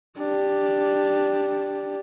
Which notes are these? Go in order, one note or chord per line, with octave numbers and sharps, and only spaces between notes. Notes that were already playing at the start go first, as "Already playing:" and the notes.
D4 G4